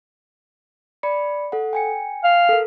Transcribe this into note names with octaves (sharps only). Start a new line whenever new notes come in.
D5 B5 C#7
A4 F#5
G5 G#5 C#7
F5
A4 A#4